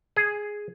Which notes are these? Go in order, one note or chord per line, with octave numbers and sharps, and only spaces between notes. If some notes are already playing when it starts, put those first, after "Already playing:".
G#4